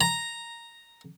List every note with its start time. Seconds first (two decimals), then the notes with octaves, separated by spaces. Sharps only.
0.01 A#5